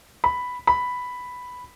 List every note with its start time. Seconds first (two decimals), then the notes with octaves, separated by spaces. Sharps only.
0.24 B5
0.67 B5